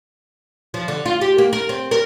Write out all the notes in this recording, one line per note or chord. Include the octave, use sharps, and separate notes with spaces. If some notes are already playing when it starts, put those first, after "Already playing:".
F3
D3
F4
G4
A#3
A#4
C4
A#4